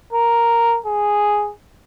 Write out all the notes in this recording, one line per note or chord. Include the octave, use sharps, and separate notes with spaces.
A#4
G#4